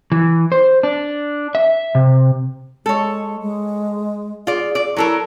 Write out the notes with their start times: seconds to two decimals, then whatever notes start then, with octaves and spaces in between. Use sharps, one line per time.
0.12 E3
0.52 C5
0.83 D4
1.55 E5
1.95 C3
2.86 G#3 A4 C#5
3.42 G#3
4.47 F4 G#4 D5
4.75 D5
4.97 F#3 E4 A4 A#4